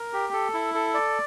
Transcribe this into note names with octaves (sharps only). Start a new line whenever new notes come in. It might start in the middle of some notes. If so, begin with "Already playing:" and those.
Already playing: A#4
G4
A4
E4
A4
D5